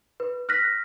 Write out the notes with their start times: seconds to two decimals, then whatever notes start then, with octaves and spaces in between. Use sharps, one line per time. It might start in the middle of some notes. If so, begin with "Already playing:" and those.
0.20 B4
0.49 F6 F#6 A#6 B6